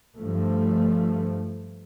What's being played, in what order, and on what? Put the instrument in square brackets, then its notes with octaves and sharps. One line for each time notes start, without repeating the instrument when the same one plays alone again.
[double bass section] G2 F3 A3